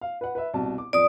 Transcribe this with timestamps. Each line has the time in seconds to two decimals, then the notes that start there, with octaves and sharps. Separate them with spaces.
0.01 F5
0.21 B4 F#5
0.35 B4 E5
0.54 C2 B2 A5
0.78 D6
0.93 F2 D5 D#6